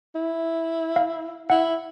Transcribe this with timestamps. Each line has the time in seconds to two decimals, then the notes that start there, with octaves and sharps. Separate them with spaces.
0.15 E4
0.96 F5
1.50 E4 F#5